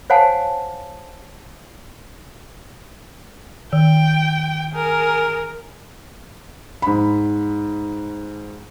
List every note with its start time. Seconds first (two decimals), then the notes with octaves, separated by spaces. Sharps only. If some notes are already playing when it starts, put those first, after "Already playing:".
0.10 C5 C#5 F5 F#5 G#5 A5
3.73 D#3 G5
4.73 G#4 A#4
6.82 G#2 B5